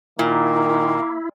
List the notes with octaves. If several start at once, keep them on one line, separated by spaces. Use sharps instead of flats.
A#2 D#3 A#3 E4